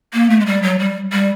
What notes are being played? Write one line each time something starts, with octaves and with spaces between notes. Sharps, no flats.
A#3
A3
G#3
G3
F#3
G3
G3